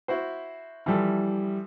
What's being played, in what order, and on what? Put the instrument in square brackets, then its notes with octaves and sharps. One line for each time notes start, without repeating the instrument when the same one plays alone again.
[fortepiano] E4 F#4 C5
[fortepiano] E3 F3 A4 [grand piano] G3 E4